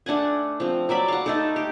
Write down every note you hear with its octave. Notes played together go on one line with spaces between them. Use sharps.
A3 D4 F#5 G#5
F3 C4
F#3 D5 E5 B5
F5 F#5
A3 D#4 A4
G4